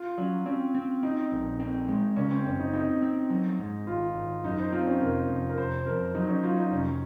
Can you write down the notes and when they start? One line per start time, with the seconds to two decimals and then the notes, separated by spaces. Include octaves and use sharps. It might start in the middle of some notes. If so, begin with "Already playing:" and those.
Already playing: F4
0.18 F#3 C#4
0.46 C4 C#4
0.75 C4
1.03 C4 D#4
1.32 A#1
1.60 C4
1.88 G#3
2.16 C#3 C#4
2.31 C4
2.45 F#1 C#4
2.60 D#4
2.73 C4 D#4
3.02 C4
3.30 F#3
3.59 G#2
3.87 G#1 F4
4.15 G#1
4.44 F#2 D#4
4.58 C5
4.72 C4 F4
4.87 C#4
5.01 F1 A#4
5.29 F1
5.49 A#4
5.58 F1 C5
5.86 F2 A#4
6.15 F#3 D#4
6.29 C#4
6.43 F#3 F4
6.57 D#4
6.71 F1 C#4